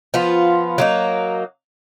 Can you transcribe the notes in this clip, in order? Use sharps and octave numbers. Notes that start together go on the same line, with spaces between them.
F3 B3 F4
F#3 A#3 D#4